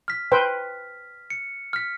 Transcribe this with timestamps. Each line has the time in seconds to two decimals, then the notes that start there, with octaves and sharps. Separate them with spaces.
0.08 F6 B6
0.32 B4 C5 G5
1.30 C#7
1.73 F6 B6